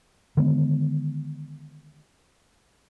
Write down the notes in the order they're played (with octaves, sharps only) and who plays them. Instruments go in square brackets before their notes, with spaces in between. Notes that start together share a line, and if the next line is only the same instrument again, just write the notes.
[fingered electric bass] D3 D#3 G#3 B3